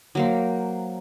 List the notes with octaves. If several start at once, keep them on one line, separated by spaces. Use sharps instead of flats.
F#3 A#3 C5